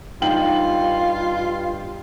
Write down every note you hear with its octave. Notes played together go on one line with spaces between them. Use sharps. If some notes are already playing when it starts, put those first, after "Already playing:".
G2 D#4 F4 G5 F#7